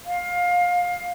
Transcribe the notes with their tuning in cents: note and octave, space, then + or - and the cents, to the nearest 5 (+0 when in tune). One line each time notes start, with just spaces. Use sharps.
F5 +20